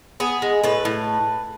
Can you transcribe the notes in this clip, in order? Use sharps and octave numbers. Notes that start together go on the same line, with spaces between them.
B3 G#4
G#3
A2 B4
A2